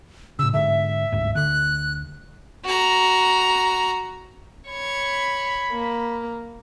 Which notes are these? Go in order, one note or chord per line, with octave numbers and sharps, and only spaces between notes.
A2 C#3 E6
G#2 D3 E5
G1 D2 G#2
D2 D3 F#6
F#4 A#5
C#5 B5 G#6
A#3